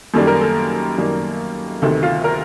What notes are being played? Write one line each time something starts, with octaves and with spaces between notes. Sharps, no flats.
F#2 D#3 G3 A#3 A4
A#4
A4
F#2 D#3 G3 A#3
D2 C3 D#3 A4
F4
A#4